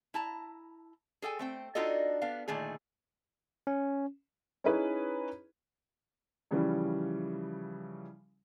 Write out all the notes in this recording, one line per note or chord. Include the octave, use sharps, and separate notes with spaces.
E4 A5 A#5
G#4 A4 G5 G#5
A3 C4 G5
D4 D#4 F4 F#4 A4 D#5
B3 D4 F5
A#2 D3 D#3 A3 D#4 G#4
C#4
C#4 D#4 E4 G#4 B4 C#5
C#3 E3 F3 G3 C#4